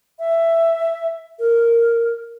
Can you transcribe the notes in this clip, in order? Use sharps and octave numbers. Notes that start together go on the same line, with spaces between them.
E5
A#4